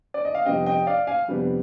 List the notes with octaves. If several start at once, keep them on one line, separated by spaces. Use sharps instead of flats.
D5
D#5
F5
F2 C3 G3 B3 D4 D#5 G5
D#5 G5
D5 F5
F5 G#5
F2 C3 G3 B3 D4